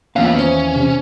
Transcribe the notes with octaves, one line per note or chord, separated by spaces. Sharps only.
E2 E3 A#3 B3 C#4 F4 F5
D#3 E3 C#4 C5
C3